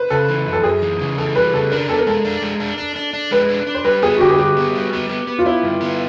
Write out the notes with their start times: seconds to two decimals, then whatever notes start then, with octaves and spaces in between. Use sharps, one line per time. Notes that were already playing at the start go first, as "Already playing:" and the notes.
Already playing: B4 C5
0.10 C#3 A4
0.29 E3
0.46 F#2
0.53 A4
0.63 F#2 G#4
0.82 E3
1.00 C#3
1.18 E3 A4
1.35 G3 B4
1.53 C#3 A4
1.71 D4 A#4
1.89 B3 A4
1.99 A#4
2.07 G#3 A4
2.25 D4
2.42 G#3
2.60 D4
2.78 D4
2.96 D4
3.13 D4
3.31 G#3 B4
3.49 D4
3.67 D4
3.75 C5
3.85 G3 B4
4.02 B3 G#4
4.17 F#4
4.21 D3 G4
4.31 G#4
4.38 G2 G4
4.57 B3
4.75 G3
4.93 B3
5.09 B3
5.27 B3
5.39 F4
5.46 B3 E4
5.63 G2
5.81 B3